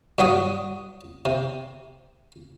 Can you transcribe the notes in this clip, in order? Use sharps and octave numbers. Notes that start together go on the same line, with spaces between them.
G2 F#3 F#4 D#6
C3